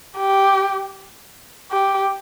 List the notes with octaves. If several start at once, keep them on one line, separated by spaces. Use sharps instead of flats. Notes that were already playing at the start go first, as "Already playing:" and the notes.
G4
G4